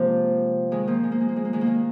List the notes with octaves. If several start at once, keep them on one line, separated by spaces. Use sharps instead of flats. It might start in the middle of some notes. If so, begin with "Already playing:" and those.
Already playing: C3 F3 G#3 A#3
D#3 G#3
F3 A#3
G#3
A#3
G#3
A#3
G#3
A#3
D#3 G#3
A#3
D#3 G#3